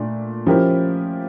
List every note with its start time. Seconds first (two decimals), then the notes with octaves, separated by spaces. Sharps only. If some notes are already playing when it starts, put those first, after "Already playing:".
Already playing: A#2 A3 D4
0.46 F3 C#4 E4 G4 A#4